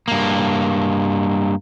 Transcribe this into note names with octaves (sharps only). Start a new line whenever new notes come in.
G2 A#3